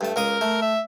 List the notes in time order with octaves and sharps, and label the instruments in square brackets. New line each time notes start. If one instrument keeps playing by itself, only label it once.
[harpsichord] G2 A5 [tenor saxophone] A3
[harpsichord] C#2 F5 D#6 [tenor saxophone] A#4
[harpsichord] A3
[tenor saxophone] E5